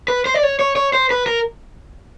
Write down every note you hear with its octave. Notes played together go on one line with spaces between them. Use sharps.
B4
C5
D5
C#5
C#5
C#5
C5
B4
A#4